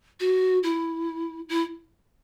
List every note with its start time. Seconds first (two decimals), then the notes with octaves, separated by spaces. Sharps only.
0.20 F#4
0.63 E4
1.49 E4